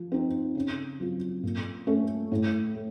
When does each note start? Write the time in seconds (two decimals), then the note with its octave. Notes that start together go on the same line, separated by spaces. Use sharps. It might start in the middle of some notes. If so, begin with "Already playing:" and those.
Already playing: F3
0.12 C4 D#4
0.55 C#3
1.00 F#3 C4 F4
1.43 A#2
1.87 A3 C#4 A4
2.32 A2
2.75 A3